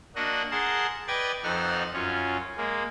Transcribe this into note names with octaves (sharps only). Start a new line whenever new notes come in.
A#3 D4 F#4 D#5 F#5
G#4 A#4 F#5 A5 C6
B4 D5 D#5 G5 G#6 A6
F2 D#4 A4 F#5 F6
F#2 C#4 F4
G#3 A#3